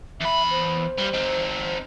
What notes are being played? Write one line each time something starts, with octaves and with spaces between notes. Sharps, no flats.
E2 E5 B5
C5
G2 G3
C4 D#4